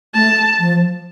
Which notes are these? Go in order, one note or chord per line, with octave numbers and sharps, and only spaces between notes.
A3 A5
F3